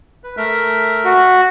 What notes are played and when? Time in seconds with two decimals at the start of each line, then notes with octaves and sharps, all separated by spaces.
0.24 B4
0.37 A3 A#4 E5
1.05 F#4